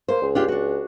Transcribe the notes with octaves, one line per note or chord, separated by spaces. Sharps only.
A#3 C5
C#2
D4 F4 G4
D4 F#4